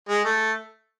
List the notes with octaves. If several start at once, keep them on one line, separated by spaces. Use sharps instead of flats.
G#3
A3